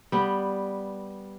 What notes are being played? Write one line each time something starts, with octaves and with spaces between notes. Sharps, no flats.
G3 B3